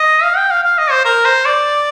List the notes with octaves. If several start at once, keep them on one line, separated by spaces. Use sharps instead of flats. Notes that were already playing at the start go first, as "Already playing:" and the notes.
Already playing: D#5
F5
G5
F5
F5
D#5
C5
A#4
C5
D5